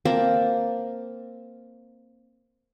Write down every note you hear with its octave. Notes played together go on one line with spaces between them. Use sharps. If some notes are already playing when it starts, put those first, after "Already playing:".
A#3 C4 D5 A5